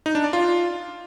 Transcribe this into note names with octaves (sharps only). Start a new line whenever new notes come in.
D#4
D4
D5
F4